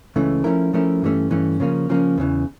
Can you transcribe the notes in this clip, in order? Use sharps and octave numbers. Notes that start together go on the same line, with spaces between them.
C#2 C#3 E3 A3
F3 A3 C#4 E4 A#4
F3 A3 C#4 E4 A#4
G2 E3 A3 C#4
G2 E3 A3 C#4
C#3 F3 A#3 C#4
C#3 F3 A#3 C#4
E2 C#3 E3